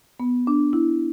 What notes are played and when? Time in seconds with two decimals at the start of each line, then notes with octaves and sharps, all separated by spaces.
0.20 B3
0.47 D4
0.73 E4